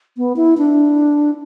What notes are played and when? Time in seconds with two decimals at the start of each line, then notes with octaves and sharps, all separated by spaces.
0.17 B3
0.36 E4
0.58 D4